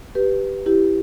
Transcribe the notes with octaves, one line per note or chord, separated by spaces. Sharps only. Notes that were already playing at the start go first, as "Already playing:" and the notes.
G4 B4
E4 G4